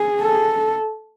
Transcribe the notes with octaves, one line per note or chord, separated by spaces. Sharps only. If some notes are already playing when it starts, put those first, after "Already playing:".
Already playing: G#4
A4